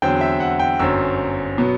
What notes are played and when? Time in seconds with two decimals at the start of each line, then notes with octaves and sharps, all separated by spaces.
0.02 E2 D3 F#3 C4 G5
0.21 E5
0.40 F#5
0.59 G5
0.79 G1 F#2 F#3 C4 E6
1.58 B2 F#3 B3